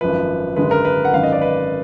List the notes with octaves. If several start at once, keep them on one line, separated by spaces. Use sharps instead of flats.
G#1 F#2 F3 B4
G#1 F#2 D3 G#3 B4
A#4
B4
F#5
G#1 F#2 D#3 F5
D#5
D5
B4